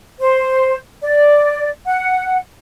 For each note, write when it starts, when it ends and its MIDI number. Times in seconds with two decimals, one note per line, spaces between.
0.20 0.76 72
1.02 1.69 74
1.86 2.38 78